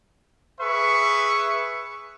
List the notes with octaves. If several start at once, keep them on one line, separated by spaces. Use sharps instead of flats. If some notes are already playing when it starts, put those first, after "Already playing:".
G#4 B4 E5 C#6